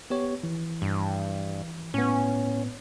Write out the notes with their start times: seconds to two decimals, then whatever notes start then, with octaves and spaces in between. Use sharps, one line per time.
0.10 B3 G4 C#5
0.43 E3
0.82 G2
1.94 A2 B3 C#4